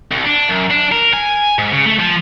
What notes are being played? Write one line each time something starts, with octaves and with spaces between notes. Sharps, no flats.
C2
D4
F#2
D4
A#4
G#5
G#2
C#3
A3
F3